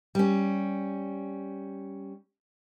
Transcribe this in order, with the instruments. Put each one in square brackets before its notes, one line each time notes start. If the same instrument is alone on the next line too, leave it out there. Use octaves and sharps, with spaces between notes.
[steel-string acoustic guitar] G3 C#4